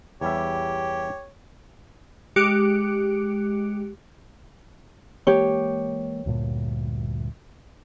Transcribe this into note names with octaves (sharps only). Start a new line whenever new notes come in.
E2 G3 G4 C#5 E5
G#3 G4 D6 F#6 C#7 D7
E3 G#3 A#3 G4 C#5
D2 G2 A#2